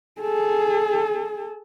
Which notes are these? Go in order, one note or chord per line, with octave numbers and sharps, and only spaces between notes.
G#4 A4